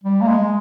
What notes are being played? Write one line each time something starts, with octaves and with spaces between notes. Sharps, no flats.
G3
A#3
G#3